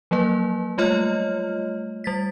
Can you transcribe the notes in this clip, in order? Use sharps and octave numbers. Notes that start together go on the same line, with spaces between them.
F3 F#3 A#3 B4
G3 A3 F4 C#5 D#5 F6
G3 A6 B6